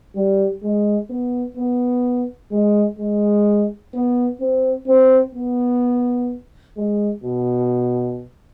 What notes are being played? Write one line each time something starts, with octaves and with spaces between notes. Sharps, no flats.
G3
G#3
B3
B3
G#3
G#3
B3
C4
C4
B3
G#3
B2